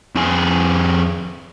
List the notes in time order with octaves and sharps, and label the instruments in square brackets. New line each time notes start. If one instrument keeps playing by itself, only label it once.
[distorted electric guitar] F2 G#4